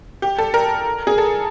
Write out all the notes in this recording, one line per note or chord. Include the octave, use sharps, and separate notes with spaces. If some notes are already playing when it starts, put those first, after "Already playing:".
G4
A4
A#4
G#4
A4